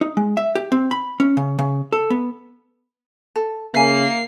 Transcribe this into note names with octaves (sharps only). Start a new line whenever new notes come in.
D#4
G#3
E5
G4
C4
B5
C#4
C#3
C#3
A4
B3
A4
C#3 A#3 E5 G#5 C7